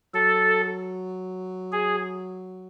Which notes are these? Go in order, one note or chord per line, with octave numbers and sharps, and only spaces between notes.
F#3 A4
G#4